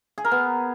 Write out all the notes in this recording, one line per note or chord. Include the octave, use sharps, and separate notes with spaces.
G#4
A#4
B3